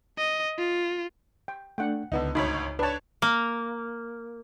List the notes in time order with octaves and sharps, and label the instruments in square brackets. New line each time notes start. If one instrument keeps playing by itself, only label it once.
[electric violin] D#5
F4
[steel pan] G5
[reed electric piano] A3 D4 [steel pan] F#5 G5
[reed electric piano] C#2 [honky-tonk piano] D3 B3 D#4
[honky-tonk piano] G#1 D2 C#5 [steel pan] D#4 B5
[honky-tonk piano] D4 C#5 [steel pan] B4 A5
[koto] A#3